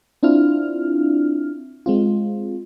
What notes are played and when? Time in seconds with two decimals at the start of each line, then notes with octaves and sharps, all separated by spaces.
0.23 C4 D4 E4 F4 F6
1.86 G#3 C4 F4